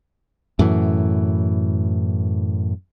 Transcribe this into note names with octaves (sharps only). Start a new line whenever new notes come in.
F#2 A2 E3